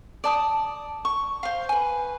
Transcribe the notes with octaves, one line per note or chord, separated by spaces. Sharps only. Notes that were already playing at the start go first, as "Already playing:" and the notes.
D5 A5 D#6
C#6
C5 F5
B4 G#5